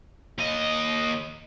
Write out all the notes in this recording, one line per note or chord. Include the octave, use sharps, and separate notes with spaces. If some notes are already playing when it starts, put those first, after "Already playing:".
D#2 D#5